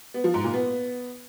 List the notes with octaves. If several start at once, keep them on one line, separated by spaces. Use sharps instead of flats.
B3
F3
G#2
A#2
B3